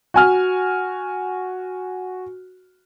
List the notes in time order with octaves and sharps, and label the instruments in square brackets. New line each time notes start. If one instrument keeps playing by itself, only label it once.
[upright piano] F#4 G#5 F6